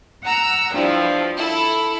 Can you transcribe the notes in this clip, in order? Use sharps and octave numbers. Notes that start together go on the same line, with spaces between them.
F#5 A#5 E6
G2 F3 E4
E4 A4